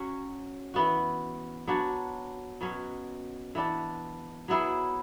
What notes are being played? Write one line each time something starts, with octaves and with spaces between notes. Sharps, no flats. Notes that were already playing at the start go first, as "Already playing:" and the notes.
Already playing: F#3 C#4 F#4
E3 B3 F#4
F#3 B3 D4 F#4
B2 F#3 C#4
E3 B3 D4
F#3 B3 E4 G#4